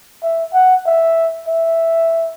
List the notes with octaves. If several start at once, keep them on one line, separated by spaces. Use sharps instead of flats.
E5
F#5
E5
E5